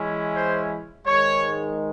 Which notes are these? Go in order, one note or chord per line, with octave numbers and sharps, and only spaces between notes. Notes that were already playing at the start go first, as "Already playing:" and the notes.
Already playing: E3 G#3 C#4 E4
C5
G#2 D#3 G#3 C#5